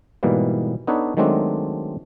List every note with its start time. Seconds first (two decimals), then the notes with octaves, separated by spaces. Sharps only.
0.23 G#2 B2 E3 G3 A#3
0.87 B3 D4 D#4 A4 B4 C#5
1.17 D#3 F#3 G#3 A3 C4 D4